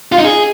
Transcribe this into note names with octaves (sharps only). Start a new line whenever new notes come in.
F4
D#4
G#4